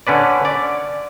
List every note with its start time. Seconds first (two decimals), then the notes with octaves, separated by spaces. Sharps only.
0.07 D3 C#4 B4 D5
0.45 D5